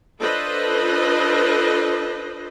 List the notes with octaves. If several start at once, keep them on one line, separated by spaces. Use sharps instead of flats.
D4 F4 A4 B4 C5 D#5